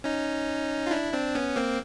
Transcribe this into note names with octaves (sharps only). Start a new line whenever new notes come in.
C#4 D#4
F4
D4 E4
C4 D4
B3 C#4
A#3 C4